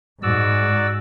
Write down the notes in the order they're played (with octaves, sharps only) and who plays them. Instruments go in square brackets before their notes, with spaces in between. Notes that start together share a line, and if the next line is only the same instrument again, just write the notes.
[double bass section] G#2 [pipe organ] F#4 D5 E6